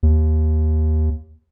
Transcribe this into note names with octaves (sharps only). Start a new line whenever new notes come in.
D#2